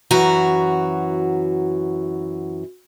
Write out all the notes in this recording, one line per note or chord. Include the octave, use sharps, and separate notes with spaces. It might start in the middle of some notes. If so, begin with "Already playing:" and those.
F#2 E3 F#4 A#5